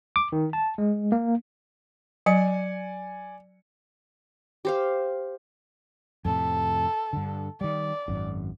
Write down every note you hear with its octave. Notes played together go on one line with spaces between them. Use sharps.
D6
D#3
A5
G#3
A#3
F#3 D5 G#5 C#7
G4 C5 F5
F2 A2 C3 A4
G2 D3
D#3 G3 D5
G#1 F#2